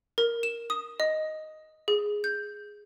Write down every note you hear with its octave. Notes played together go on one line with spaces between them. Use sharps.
A#4
E7
D#6
D#5
G#4
G6